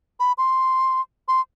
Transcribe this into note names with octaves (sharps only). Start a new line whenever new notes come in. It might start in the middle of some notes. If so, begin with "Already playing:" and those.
B5
C6
C6